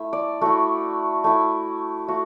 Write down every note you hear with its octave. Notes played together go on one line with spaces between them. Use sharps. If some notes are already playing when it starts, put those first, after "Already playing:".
Already playing: A3 E4 E5
D5
A3 E4 F#4
A3 E4
A3 F#4